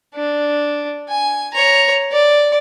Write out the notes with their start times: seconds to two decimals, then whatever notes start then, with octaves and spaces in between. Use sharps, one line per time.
0.15 D4
1.09 G#5
1.54 C#5 A#5
2.12 D5